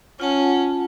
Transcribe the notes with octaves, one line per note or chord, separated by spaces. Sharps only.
C#4 F4 F#5 A5